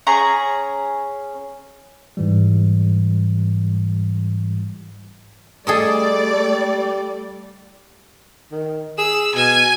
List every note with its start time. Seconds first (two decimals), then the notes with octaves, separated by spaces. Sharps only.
0.07 C#4 G#4 A#5
2.17 G#2 E3 G3
5.67 G3 A3 G#4 A4 D5 D#5
8.52 D#3
8.98 G#4 E6
9.35 B2 G#5